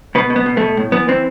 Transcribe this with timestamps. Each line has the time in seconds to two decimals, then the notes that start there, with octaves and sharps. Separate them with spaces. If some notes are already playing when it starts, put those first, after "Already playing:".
0.15 B2 B3
0.30 B2
0.36 B3
0.46 B2
0.57 B2 A3
0.77 A2
0.92 E3 B3
1.08 E3 C4